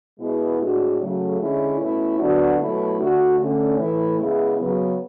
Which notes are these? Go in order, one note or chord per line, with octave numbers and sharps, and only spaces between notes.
B2 G#3 B3 E4
A2 G#3 D4 F#4
C#3 F#3 A3
D3 G#3 C#4 E4
B2 A3 C#4 E4
D3 F#3 B3 D4 F#4
B2 F#3 A3 E4
D3 A3 D4 F#4
D3 A3 C#4
A2 E3 A3 E4
C#3 G#3 B3 E4
C#3 F#3 B3